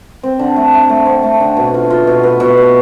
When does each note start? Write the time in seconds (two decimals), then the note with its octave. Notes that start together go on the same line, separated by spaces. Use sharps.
0.23 C4
0.39 D3
0.56 A3
0.73 A3
0.89 A3
1.06 C4
1.23 A3
1.40 D3
1.57 B2
1.74 F4
1.90 F4
2.07 B2
2.23 B3
2.40 B2
2.58 B2